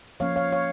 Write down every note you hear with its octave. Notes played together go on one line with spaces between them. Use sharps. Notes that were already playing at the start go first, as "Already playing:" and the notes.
F3 A#3 C#4 C#5 F5
C#5 F5
C#5 F5